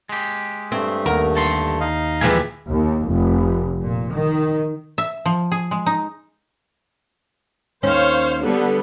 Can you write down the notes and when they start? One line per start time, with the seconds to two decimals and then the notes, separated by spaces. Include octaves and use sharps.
0.09 G#3 G4
0.72 G2 A3 C4
1.06 D#2 A#4 F#5
1.35 D3 A4 C6
1.80 D#4 D#5 F5
2.21 A#2 E3 F3 G#3 G4 G#5
2.71 D#2
3.09 F1
3.82 A#2
4.14 D#3
4.98 E5
5.26 F3
5.52 G#4
5.71 G#3
5.86 D#4
7.83 D#2 C#4 C5 C#5 F5
8.42 D3 G3 B3